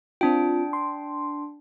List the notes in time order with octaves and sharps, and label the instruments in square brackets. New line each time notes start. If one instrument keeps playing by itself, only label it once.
[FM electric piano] C4 F4 [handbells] D4 G5
[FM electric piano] C6